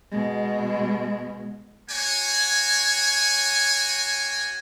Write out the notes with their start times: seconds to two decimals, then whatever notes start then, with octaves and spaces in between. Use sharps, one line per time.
0.12 B2 G#3
1.89 A#3 F#4 C#5 G5 G#5